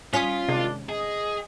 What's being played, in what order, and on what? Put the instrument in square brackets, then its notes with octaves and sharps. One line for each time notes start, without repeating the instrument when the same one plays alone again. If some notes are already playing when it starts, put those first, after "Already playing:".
[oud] C#4 [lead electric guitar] F4 [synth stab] D#6 B6
[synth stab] C3 D#3 G#3 [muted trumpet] D4
[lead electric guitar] G#4 [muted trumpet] D#5